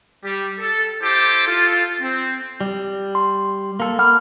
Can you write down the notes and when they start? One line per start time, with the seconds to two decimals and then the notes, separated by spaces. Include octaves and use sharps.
0.25 G3 G4
0.60 A4
1.03 E4 G4 A4 C5 D6
1.47 F4 A4
2.01 C4
2.61 G3
3.15 C6
3.80 A#3 A4
3.99 A#3 F#5 B5 F6